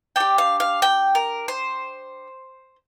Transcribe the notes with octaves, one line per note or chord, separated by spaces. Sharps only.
D4 G4 G5
F5
F5
G5
A#4
C5